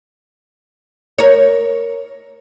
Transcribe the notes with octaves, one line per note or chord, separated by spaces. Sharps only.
A#4 C#5